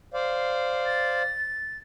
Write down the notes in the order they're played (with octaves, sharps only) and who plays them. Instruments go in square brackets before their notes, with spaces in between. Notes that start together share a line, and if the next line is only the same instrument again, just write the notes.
[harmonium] C5 D5 F5
[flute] A6